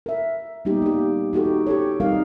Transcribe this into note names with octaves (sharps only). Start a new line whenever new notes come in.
A#4 E5
G3 A#3 B3 D#4 G4
A#3 G4
D#4 F#4 G4 A4
G4 A4 C#5
G3 C4 D#4 A#4 F5